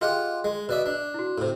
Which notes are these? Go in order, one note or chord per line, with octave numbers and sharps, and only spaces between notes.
F4 G4 G#4 D#5 F#5 F6
G#3
B2 D5 E5
D4
E4 F#4
A2 C3